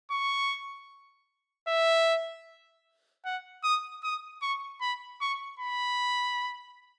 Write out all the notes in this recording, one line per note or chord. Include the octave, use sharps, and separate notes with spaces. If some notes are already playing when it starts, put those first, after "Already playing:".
C#6
E5
F#5
D#6
D#6
C#6
B5
C#6
B5